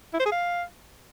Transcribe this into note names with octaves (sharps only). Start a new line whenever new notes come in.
E4
C5
G#4
F5